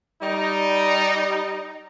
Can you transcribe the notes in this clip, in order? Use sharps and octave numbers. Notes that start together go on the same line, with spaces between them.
G3 D#4